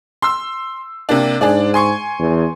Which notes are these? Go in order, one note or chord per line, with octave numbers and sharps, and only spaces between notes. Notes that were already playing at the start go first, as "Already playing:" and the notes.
C6 E6
C3 A#3 D4
G#2 D4 G#4 D5
G#5 C6 C#6
E2